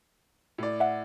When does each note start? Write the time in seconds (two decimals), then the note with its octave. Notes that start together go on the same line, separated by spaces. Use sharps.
0.58 A2 D5
0.80 E5 F#5